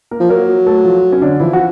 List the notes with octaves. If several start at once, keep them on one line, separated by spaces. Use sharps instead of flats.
A#3 A#4
F3
F#3 A#3 A#4
A3 A4
F3 F4
C#4
D3 D4
E3 F3 E4
F#4